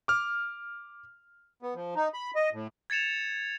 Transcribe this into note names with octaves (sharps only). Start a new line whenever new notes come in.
D6 F6
B3
F3
D#4
B5
D#5
A2
G#6 A6 C#7 E7 F7